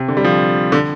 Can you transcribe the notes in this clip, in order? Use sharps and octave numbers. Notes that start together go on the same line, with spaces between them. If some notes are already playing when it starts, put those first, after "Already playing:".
Already playing: C3
D3
G3
F3
D3